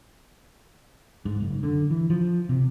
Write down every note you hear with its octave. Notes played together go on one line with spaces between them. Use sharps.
G#2
F#1
D3
E3
F3
C3